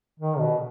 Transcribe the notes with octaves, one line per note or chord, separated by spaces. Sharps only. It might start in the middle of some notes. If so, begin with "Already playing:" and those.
D#3
B2